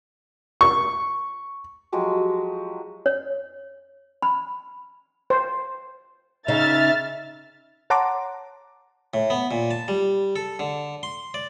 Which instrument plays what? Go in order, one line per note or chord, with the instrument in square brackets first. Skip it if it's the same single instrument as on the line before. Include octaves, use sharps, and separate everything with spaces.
[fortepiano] C#6
[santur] F3 F#3 G#3 G4
[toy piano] C#5
B5
[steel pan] C5
[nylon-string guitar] C#3 D#4 [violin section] E5 F6 A6
[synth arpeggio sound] C#5 F#5 A5 A#5 C6 D6
[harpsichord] A2
B3
A#2
A5
G3
A4
D3
C6
D5